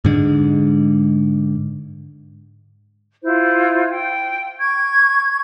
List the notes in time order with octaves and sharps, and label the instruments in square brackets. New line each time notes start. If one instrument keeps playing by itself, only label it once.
[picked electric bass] G#2 D3 G#3
[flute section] E4 F4 C5
G5
C#6 G#6